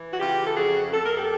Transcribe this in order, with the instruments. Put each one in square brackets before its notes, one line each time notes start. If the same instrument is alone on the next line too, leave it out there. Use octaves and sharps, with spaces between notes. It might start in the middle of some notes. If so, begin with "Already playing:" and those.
Already playing: [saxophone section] E3
F#4
C#3 F4 G4
A4
F2 F#4 G#4
F2 A4
A#4
G4 A4